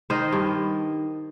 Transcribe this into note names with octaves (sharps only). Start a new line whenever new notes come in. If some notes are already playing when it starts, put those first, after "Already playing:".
D#3 C5 D#5
G2